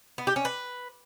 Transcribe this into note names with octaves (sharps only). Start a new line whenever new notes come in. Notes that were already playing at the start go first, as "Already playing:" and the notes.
B3
G4
C#4
B4